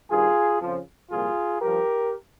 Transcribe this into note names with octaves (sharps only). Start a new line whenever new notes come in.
G2 D#3 F4 G#4
F2 C#3 F3
C2 A#2 F3 F4 G#4
G2 F3 G4 A#4